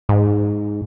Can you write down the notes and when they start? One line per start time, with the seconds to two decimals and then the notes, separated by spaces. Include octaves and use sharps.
0.09 G#2